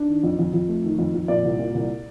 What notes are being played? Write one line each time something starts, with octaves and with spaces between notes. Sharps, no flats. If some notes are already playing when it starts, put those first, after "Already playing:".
Already playing: D4
D#3
F2
F2
F2
A3
D#3
F2
F2
A#2 D5
C2
A#2
C2